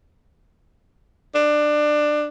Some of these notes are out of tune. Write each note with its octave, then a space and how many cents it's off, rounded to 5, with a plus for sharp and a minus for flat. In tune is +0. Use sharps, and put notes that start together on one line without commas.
D4 +20